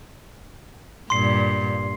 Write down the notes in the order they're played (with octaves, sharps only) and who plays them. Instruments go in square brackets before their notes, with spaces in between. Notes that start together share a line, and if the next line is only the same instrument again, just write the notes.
[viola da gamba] G2 A#2 [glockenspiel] C6 C7